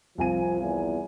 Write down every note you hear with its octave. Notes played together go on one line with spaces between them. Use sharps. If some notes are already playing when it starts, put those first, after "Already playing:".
C2 F3 G#5 D#7
E2